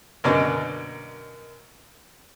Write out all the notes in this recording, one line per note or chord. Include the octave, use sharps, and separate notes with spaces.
F#2 B2 D3 A#3 D5 D#5